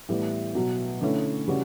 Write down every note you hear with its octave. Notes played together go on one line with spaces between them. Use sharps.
A2 E3 G3 B3
B2 F#3 B3
D3 A3 C#4 E4 A4
C#3 E3 G3 C#4 F#4